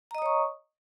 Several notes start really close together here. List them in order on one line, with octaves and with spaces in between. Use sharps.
A#5 D#5 D#6 C#5 C#6